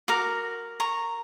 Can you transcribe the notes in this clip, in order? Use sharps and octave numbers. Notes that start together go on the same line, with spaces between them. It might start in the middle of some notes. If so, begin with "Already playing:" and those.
F#4 A#4 D6
A#5 C#6